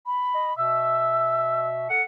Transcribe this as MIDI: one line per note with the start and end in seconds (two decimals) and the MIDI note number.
0.06 0.56 83
0.35 0.50 75
0.58 1.87 47
0.58 1.87 76
0.58 1.66 88
1.90 2.02 69
1.90 2.02 78
1.90 2.02 97